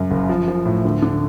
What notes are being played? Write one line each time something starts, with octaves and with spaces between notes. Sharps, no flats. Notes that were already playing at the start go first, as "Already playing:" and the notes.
Already playing: F#2 C#3
F#1
F3
F3
A2
D2
D3